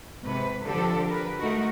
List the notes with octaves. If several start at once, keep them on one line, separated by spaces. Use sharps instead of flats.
G#2 C3 B4
D3 F3 D4 G4 A4
A#4 B4
G#3 A3 D#4 F#4 A#4